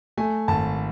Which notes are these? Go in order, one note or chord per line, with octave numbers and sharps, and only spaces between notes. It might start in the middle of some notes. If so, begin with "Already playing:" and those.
A3 G#5
G#1 A5